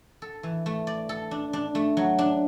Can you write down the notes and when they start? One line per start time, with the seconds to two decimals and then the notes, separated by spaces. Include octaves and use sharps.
0.22 A4
0.43 E3
0.66 A3
0.87 D5
1.09 A4
1.31 D4
1.53 D4
1.75 A3
1.97 F#3
2.18 D4